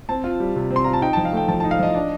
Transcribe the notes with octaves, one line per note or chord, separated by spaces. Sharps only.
C4 A5
F4
G3
C3
C4
C6
F4 A#5
A5
D#4 G5
F3 A5
F5
A3 G5
F3 A5
D#4 A5
F5
F3 D#5
D4